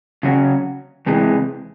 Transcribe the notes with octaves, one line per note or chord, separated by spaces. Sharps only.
C#3 F#3 C#4 F#4
E2 C3 E3 G#3